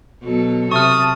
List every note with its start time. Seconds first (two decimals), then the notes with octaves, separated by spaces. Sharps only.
0.22 B2 F#3 A4
0.72 C3 E5 A5 C#6 D#6 F6